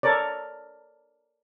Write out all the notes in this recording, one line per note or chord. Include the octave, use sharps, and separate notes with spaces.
A4 A#4 C#5 D5